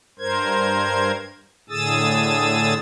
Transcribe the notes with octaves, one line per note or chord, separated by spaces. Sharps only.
G2 A#4 C5 G#6
A2 D3 G#4 D#6 E6 A6